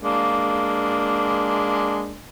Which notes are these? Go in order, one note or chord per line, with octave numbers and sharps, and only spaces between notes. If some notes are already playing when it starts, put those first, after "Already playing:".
G#3 A#3 D4